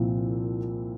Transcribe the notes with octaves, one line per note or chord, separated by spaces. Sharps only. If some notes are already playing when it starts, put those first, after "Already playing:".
Already playing: C2 A#2 F3 C4 E4